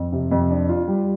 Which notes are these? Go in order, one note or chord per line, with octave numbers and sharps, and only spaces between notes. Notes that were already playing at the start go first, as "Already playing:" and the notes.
Already playing: F2
C3
F2
D4
F4
G3